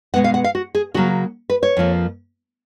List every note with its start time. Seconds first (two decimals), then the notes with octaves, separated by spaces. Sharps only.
0.14 B2 G#3 B3 F#5
0.24 F5
0.34 F#5
0.44 F5
0.55 F#4
0.75 G#4
0.94 C#3 F#3 A#3 F#4
1.50 B4
1.63 C#5
1.77 F2 F3 A#3